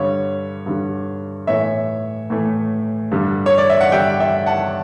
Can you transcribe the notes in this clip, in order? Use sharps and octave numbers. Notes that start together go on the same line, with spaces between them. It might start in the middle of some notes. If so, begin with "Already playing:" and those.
Already playing: G2 D3 G3 C#5
G2 D3 G3
A2 E3 A3 C#5 E5
A2 E3 A3
G2 D3 G3
C#5
D5
E5
F#5
G2 D3 G3 E5 G5
E5 G5
F#5 A5